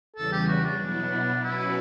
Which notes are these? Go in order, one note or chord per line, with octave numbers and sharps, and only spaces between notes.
E2 C#3 E3 G3 A4
G4
F#4
D4
B2 F#3 B3 E4
B2 F#3 C#4 E4 F#4 B4